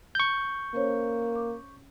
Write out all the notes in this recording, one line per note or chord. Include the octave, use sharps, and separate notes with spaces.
C#6 G6
A#3 C#4 C5 C#5
D6